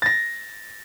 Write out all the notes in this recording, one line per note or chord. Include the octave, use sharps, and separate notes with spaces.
A6 A#6